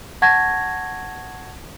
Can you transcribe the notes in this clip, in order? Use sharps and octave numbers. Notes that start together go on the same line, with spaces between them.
F#5 A5 C#6 G#6 A#6